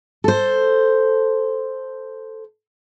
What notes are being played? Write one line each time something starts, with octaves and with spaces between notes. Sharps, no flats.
A4 C5